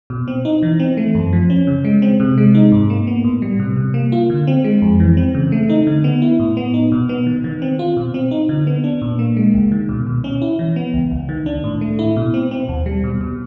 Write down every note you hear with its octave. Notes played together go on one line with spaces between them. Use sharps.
B2
C4
D#4
E3
C4
A3
F#2
F3
C#4
C#3
G#3
C4
C3
G#3
D#4
G#2
A#3
B3
A2
G3
C3
C3
A#3
F4
D3
C4
G#3
F2
E3
C4
C#3
A3
D#4
D3
B3
E4
A2
B3
D#4
B2
B3
D#3
D#3
C4
F4
B2
C4
D#4
D3
B3
D4
A#2
A#3
G#3
C#2
D#3
B2
B2
C#4
E4
E3
B3
C#2
C#2
D#3
D4
A2
A3
E4
B2
C4
C4
D#2
G3
B2
B2